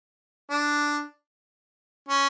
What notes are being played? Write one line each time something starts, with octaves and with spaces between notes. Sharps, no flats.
D4
C#4